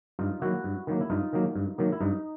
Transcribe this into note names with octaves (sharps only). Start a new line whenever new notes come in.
G2 D#4 F4
D#3 F#3 A#3 E4 F#4
G2
D#3 F#3 A#3
E4
G2 D#4 F4
D#3 F#3 A#3
G2
D#3 F#3 A#3
E4
G2 D#4